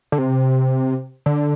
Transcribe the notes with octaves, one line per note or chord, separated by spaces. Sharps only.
D3
C3
D3